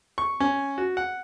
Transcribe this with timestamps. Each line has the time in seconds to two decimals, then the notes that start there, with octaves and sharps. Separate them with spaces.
0.18 C#6
0.40 C#4
0.78 F#4
0.97 F#5